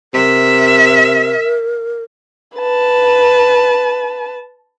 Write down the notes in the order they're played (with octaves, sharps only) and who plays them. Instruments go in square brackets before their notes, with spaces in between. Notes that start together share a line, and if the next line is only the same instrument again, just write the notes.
[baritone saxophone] C3 [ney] A#4 [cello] E5
[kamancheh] B4 A5